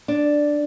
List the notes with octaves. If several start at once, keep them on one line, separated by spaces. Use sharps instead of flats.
D4